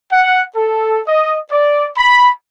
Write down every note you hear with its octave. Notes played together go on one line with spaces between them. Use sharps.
F#5
A4
D#5
D5
B5